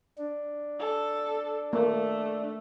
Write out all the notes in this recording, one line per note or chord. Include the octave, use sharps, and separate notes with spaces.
D4
A4
A3 A#3